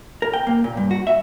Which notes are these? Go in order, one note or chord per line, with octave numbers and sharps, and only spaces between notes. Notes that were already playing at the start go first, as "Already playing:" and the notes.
A#4
G5
A#3
A#2
G2
F#4
E5